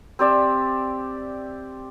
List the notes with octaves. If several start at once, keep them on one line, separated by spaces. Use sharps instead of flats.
C4 G4 D5 E5